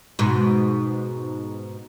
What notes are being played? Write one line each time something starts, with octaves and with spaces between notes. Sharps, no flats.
G#2 B2